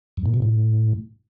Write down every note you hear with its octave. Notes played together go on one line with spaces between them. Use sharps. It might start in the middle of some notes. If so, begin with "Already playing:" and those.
F#2
A#2
B2
A2